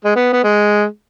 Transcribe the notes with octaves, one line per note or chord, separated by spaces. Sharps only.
G#3
B3
B3
G#3